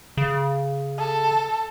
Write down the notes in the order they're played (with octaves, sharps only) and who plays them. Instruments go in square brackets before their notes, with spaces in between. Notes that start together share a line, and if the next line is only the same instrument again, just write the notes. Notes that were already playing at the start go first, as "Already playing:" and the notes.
[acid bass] C#3
[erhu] A4